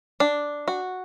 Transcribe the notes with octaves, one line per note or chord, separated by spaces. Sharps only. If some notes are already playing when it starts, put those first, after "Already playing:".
D4
F#4